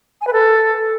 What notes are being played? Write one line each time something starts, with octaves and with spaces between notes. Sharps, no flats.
G#5
B4
A4